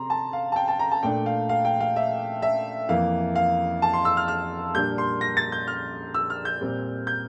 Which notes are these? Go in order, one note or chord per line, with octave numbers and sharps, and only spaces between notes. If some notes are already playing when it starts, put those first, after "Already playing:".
Already playing: C3 C4 A#5 C6
A5
F5
A5
G5
A5
A#5
A5
A#2 A3 D4 G5
F5
F5
G5
F5
E5
E5
F2 E3 A#3 F5
F5
A5
C6
E6
F6
F6
A#2 G3 A#3 D4 G6
C6
A#6
A6
G6
F6
E6
F6
G6
A#2 G3 C4
G6